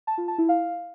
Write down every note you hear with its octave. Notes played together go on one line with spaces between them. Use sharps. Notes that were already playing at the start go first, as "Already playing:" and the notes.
A5
F4
A5
E4
F5